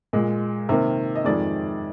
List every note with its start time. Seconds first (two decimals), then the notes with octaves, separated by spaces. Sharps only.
0.13 A#2 G#3
0.69 C3 D#3 A#3
1.16 D#5
1.25 F2 D#3 G#3 D5